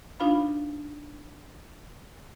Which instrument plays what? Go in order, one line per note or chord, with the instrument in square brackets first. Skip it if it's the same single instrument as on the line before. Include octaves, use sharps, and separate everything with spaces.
[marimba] D4 D#4 F4 C5 F5 B5